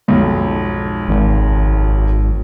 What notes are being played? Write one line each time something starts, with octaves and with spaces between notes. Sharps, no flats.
B1 F2 G#2
G#1